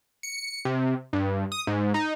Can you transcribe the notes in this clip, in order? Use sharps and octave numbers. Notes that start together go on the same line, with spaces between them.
C#7
C3
G2
D#6
G#2
D#4